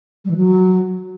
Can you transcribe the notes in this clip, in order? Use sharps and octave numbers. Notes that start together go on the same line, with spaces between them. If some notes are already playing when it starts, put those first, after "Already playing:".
G3
E3
F#3